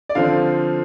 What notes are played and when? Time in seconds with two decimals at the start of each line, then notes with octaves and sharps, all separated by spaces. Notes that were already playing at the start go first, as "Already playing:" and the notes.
0.09 D5
0.15 D3 F3 C4 F5